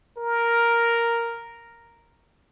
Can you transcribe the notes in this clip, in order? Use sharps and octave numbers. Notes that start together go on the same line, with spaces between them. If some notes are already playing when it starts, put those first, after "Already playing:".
A#4